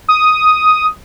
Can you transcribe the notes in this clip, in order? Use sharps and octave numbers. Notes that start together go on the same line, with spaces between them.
D#6